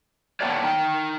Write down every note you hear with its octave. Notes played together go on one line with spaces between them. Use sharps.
A#3 B3 D4 G4 C#5 D5
D#4 G5